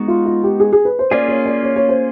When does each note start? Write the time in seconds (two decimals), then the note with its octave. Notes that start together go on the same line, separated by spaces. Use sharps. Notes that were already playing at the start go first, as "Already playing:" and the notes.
Already playing: G#3 B3 D#4 F#4
0.08 F4
0.26 F4
0.43 G4
0.60 G#4
0.73 G#4
0.85 B4
0.99 C5
1.11 A#3 C#4 F4 G#4 D5
1.29 C#5
1.46 D5
1.63 C#5
1.76 C#5
1.89 C5